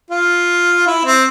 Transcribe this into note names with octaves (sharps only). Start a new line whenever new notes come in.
F4
E4
C4